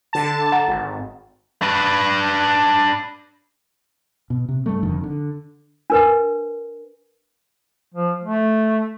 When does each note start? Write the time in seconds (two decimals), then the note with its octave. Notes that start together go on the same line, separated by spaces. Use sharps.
0.13 D3 A5
0.52 F#5 A#5
0.68 G#1
1.62 D4 B4
4.30 B2
4.49 C3
4.66 G2 G3 A3
4.83 F1 F2 D3 D#3
5.04 D3
5.90 D4 A#4 B4
7.94 F3
8.24 A3